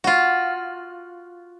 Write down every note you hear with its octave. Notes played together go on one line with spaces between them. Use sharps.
F4 F#4